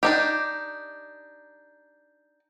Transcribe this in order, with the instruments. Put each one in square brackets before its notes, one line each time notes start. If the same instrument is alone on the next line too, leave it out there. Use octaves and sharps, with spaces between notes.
[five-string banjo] D4 D#4 G4